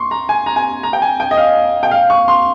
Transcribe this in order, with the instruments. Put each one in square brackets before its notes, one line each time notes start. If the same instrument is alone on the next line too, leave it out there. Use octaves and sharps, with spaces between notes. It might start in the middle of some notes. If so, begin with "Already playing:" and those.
Already playing: [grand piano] C6 C#6
A#5
G#5
A#5
G#5
A#5
G5
G#5
G5
D#5
F5
G5
F5
C#6
C6